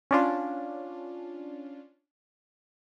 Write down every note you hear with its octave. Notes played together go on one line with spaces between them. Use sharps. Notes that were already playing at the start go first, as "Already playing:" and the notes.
C#4 D4 F4